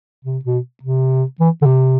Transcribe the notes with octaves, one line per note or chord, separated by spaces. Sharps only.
C3
B2
C3
E3
D3
C3